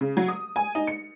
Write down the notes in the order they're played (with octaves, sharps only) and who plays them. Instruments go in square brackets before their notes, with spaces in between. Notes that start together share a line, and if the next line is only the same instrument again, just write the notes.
[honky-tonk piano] C#3
F#3
D#6
G#5
D#4
C#7